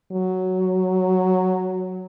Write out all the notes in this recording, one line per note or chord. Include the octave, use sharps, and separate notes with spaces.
F#3